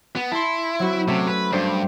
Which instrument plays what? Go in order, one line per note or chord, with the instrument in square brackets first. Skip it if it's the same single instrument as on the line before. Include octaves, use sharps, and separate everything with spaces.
[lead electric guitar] B3
[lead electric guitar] E4 [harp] A5 C6
[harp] F#3 C4 F#4
[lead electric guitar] C3 [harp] A3 C#4 E5
[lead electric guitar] B4
[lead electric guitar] G2 [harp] D4 C5